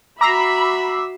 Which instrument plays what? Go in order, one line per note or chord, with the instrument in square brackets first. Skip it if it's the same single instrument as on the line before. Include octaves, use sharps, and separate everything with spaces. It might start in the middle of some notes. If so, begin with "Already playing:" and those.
[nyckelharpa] F#4 E5 [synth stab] A#5 [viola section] B5 [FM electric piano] D6 E6 C7